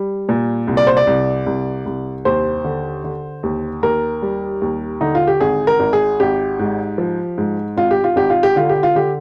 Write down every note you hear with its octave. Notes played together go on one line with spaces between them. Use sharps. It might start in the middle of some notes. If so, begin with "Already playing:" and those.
Already playing: G3
A#2
C2
D5
C5
D5
C2
C2
C2
D#2 C5
D3
D3
D#2
D#2 A#4
G3
D#2
D3 D#4
F4
G4
G#1 G#4
A#4
G#1
G#4
G#1 G4
G#2
F3
G#2
G#1 F4
G4
F4
G#1 G4
F4
G4
D3 F4
G4
F4
D3 G4